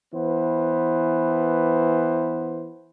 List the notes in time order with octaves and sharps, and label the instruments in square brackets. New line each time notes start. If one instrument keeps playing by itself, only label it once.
[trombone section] E3 B3 C5